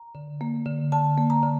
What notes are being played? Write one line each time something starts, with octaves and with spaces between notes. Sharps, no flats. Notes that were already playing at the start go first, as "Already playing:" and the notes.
Already playing: A#5
D3
A#3
D3
D3 A5
A#3
A#5
D3